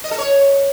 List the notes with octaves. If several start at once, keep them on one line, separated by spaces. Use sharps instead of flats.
D#5
A4
C#5